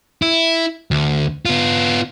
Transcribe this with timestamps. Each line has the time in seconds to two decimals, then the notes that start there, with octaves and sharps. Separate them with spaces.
0.22 E4
0.91 D2
1.45 B3 F4